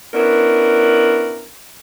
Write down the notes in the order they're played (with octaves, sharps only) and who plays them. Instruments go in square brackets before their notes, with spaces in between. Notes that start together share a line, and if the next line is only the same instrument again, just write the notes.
[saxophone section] B3 C#4 D4 E4 A#4